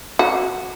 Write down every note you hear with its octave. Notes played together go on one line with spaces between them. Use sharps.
F#4